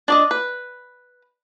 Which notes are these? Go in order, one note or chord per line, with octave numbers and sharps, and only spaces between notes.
D4 D5 D#5
B4